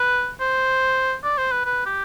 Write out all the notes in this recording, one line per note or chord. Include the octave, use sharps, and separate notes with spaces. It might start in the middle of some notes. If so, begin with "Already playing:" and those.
Already playing: B4
C5
D5
C5
B4
B4
G4